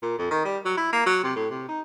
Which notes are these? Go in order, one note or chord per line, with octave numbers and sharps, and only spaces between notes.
A#2
F2
D#3
G3
F#3
E4
A#3
F#3
C3
A2
C3
D#4